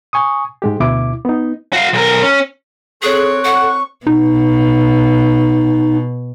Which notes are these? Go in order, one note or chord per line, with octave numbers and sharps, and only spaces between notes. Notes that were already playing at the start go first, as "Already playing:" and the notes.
G#5 C#6 D#6
G#2 G#3 G4
D2 B2 E4 D6
B3 D#4
F#4 F5
B1 A#4
C#4
C4 G#4 A4 C#5 F#6
F#5 C#6
B2 D#4